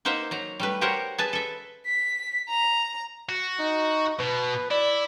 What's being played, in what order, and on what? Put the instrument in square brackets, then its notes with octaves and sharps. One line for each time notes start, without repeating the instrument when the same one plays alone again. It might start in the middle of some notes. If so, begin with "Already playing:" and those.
[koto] A#3 D#4 C5 E5 F#5
F#3 A#5
G3 A3 B4
G4 A#4 C5 C#5 F#5
G#4 B4 E5 A5
A4 E5
[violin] B6
A#5
[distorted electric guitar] F#4
[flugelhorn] D#4
[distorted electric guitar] B2 [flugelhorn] B4
[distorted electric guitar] E4 [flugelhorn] D5